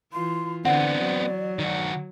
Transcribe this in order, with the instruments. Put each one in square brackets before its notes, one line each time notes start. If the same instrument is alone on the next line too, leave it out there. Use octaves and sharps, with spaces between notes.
[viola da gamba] E3 F4 [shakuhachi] C6
[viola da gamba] D3 [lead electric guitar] B3 C4 [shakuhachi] D5 [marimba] F#5
[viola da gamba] F#3
[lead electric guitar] D#3 F#4